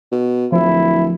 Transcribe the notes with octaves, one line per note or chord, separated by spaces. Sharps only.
B2
D1 F3 E4